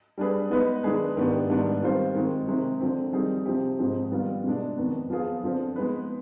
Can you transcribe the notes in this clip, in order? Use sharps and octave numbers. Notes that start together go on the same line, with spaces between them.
G3 D4 G#4 B4
G#3 B3 D#4 B4
D#3 G#3 D4 G#4 B4
G#2 D#3 B3 D4 G4
G#2 D#3 G3 B3 D4
D#3 G3 C4 F4 C5
D#3 G#3 C4
C3 D#3 G#3 C4 D#4
D3 F3 C4
D#3 G3 C4 D#4 G#4
C3 F3 C4 G4
G#2 F3 C4 D#4 G#4
D#3 G3 B3 F4
B2 G#3 D4
F2 D#3 B3
F3 B3 F4 G#4
D3 F3 C4
G#3 B3 D#4 B4